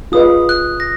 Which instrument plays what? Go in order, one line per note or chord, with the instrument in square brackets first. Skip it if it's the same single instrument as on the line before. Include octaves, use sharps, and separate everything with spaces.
[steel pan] F4 G#4 B4 D#5 [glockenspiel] D#6
[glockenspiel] F#6
A#6